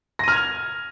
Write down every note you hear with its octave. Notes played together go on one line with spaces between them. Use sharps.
F6 G#6 A#6 D#7 F7